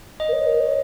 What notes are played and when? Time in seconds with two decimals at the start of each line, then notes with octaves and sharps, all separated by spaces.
0.20 D#5
0.28 A#4
0.33 C#5
0.46 A#4
0.60 C#5